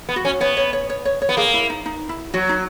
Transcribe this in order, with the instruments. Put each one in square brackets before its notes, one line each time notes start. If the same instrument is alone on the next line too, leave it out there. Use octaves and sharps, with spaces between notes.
[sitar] B3
[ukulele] F#4
[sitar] C#4
[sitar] B3 [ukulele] C#5
[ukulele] C#5
C#5
C#5
C#5
C#5
[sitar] B3
[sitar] A#3 [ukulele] G#4
[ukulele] E4
D#4
D#4
E4
[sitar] F#3 [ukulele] F#4
[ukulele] D#4